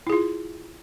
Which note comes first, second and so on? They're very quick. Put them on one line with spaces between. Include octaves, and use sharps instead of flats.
E4 G#4 F4